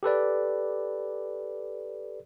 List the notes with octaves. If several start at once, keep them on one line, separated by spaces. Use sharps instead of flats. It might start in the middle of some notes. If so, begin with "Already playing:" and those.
G4 A4 B4 D5